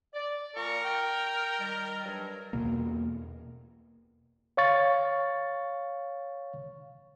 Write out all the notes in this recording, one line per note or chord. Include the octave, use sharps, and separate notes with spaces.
D5
A#2 F3 A#4 C#6
G5
D#3 G3
G2 F#3
E2 G#2 B2 A#3
C#5 F5 C#6 A6